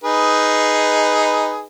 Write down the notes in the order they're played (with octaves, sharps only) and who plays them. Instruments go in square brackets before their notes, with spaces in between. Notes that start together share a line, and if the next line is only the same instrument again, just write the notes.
[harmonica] D#4 G#4 B4